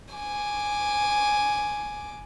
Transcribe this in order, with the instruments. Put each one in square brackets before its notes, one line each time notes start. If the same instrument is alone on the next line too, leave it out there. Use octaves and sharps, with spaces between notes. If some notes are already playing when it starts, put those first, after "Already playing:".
[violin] G#5 D6